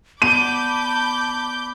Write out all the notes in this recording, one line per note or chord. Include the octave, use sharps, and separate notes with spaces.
B3 D5 A5 B5 D6 G6 D#7